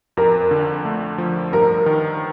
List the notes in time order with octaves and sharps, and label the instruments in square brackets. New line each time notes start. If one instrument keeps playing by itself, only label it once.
[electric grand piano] F2 [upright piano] A#4
[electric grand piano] D3
A3
F3
[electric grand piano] G2 [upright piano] A#4
[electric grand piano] D#3